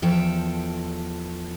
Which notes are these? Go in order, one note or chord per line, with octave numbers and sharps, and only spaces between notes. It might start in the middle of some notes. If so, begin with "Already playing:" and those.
E2 F3 A4 G5